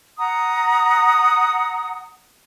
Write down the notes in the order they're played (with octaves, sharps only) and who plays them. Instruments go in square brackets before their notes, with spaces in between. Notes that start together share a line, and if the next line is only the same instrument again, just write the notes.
[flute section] F#5 A#5 D#6